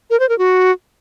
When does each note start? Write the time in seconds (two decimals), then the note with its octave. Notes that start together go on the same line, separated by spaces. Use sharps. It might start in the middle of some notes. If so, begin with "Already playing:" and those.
0.10 A#4
0.20 C5
0.29 A#4
0.38 F#4